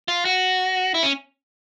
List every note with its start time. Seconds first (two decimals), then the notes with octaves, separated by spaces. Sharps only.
0.08 F4
0.25 F#4
0.94 E4
1.03 C#4